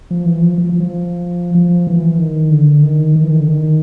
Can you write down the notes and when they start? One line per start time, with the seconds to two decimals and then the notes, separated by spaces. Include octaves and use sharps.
0.11 F3
0.26 E3
0.42 F3
0.58 F3
0.69 F3
0.80 F3
1.55 F3
1.87 E3
2.18 D#3
2.51 D3
2.83 D#3
3.15 D#3
3.23 E3
3.31 D#3
3.39 D3
3.47 D#3